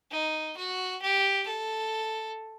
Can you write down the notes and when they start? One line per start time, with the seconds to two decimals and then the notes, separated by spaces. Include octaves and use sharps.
0.11 D#4
0.57 F#4
1.02 G4
1.47 A4